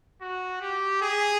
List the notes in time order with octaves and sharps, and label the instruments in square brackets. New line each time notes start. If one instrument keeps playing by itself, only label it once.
[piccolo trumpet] F#4
G4
G#4